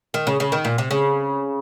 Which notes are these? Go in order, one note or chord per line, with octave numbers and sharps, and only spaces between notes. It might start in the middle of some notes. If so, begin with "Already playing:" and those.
D#3
C#3
C#3
D#3
A#2
C3
C#3